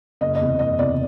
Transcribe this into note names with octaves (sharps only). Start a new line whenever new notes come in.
F#1 D#5
D#5
E2 C3
F#1 D#5
E2 C3 D5